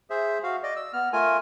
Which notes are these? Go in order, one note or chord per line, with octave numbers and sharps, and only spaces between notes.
G#4 C5 E5
F#4 F5
D5 D#5
E6
B3 F6
A3 F4 A#4 G#5